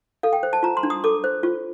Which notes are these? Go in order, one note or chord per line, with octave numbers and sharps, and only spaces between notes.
A4 F5
G5
C5
A5
F4 A#5
C6
D4
D#6
A4 D6
C5
F4